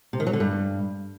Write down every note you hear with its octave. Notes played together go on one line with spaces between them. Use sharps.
C3
D#3
F#3
D3
G2